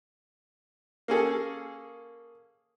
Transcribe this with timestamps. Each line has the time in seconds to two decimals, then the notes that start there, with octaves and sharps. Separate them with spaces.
1.08 A#3 C#4 G#4 A4